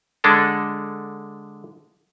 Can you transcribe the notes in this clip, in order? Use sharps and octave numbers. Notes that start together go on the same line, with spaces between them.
D3 G#3 D4 A4